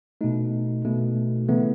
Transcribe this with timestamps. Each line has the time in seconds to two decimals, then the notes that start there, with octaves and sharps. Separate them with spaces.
0.21 B2 A3 D#4
0.85 B2 A3
1.49 C#3 E3 A3 B3